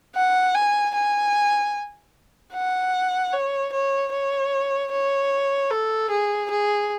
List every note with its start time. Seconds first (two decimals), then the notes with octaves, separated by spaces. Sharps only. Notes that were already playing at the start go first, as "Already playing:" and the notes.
0.16 F#5
0.55 G#5
0.95 G#5
2.53 F#5
3.33 C#5
3.73 C#5
4.13 C#5
4.92 C#5
5.71 A4
6.10 G#4
6.50 G#4